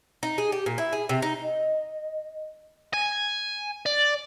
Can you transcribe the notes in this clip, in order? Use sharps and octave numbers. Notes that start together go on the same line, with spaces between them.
D#4
G#4
G4
A#2
E4
G#4
C3
D#4
D#5
G#5
D5